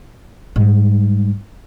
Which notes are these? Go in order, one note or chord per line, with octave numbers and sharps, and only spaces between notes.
G#2 G3